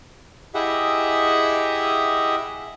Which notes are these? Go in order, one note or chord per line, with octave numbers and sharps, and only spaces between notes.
E4 G4 G#4 D#5 E5 F#5